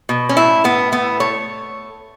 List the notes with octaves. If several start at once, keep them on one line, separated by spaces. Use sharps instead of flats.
B2
C#4
A2 E4
A2 B3
A3 B3
A3 C#5